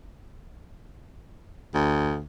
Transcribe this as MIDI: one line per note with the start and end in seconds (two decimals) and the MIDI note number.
1.74 2.23 38